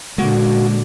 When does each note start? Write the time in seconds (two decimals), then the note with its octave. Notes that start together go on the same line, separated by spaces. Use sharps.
0.18 A#2 D3 G#3 A#3 F#4